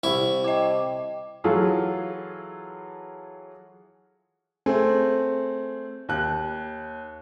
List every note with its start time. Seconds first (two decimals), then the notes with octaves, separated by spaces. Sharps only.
0.04 C2 E4 C#6
0.44 D#5 G5 D6
1.44 E3 F#3 F4 G#4 A4
4.66 A3 C4 G#4
6.09 D#2 F#6